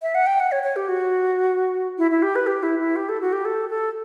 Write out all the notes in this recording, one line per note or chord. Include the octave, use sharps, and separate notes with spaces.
E5
F#5
G5
F#5
C#5
C#5
G4
F#4
E4
E4
G4
B4
G4
E4
E4
G4
A4
F#4
G4
A4
A4